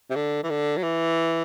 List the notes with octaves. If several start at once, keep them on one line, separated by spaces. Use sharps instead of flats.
C3
D3
E3
D3
F#3
E3